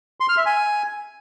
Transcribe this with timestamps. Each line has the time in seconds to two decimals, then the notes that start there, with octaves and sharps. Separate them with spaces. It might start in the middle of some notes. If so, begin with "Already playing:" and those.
0.20 C6
0.29 F6
0.37 E5
0.46 G#5